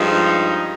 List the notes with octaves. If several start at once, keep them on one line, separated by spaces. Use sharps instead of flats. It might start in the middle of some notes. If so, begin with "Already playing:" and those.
Already playing: G2 F3 G#3 D#4